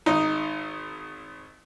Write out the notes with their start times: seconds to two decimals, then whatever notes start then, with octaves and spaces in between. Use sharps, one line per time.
0.06 G#1 D#4